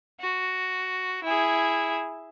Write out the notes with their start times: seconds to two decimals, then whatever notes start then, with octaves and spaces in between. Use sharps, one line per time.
0.21 F#4
1.23 E4 G#4